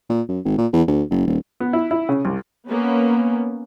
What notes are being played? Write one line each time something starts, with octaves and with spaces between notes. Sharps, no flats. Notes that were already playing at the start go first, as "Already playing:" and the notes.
A#2
F#2
G#1
A#2
E2
D2
F#1
D#1
B3
E4
E4
C#3
C2
A#3 B3 C#4